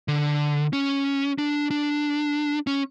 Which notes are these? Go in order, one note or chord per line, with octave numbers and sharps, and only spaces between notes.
D3
C#4
D4
D4
C#4